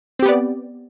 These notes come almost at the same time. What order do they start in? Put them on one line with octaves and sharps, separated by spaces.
C4 G4 B3 D5